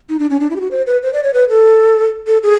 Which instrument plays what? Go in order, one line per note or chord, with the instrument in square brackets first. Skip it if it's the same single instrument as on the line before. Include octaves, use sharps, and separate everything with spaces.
[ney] D#4
D4
C#4
D4
E4
G4
F#4
C5
B4
C5
D5
C#5
B4
A4
A4
G#4